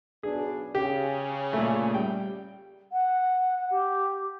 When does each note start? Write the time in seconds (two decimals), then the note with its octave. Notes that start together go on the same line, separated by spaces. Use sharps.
0.23 B1 B2 D4 G#4
0.75 C#3 G4
1.53 A#2 A3
1.94 G3 G5
2.91 F#5
3.70 G4